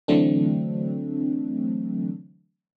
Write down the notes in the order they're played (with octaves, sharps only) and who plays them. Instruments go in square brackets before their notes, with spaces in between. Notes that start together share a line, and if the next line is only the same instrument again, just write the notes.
[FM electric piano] D3 E3 F#3 A3 C4 D4